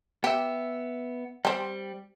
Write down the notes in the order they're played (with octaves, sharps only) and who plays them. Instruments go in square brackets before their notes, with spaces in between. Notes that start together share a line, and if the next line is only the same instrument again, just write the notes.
[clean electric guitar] B3 E5 [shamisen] G4
[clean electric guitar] G3 [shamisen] C4 G4